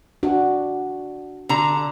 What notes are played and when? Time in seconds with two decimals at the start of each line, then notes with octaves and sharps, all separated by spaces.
0.23 D4 F#4
1.49 D3 A#5